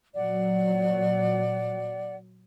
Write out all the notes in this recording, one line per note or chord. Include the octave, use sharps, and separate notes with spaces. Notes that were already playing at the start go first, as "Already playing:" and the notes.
A#2 F#3 D5 F#5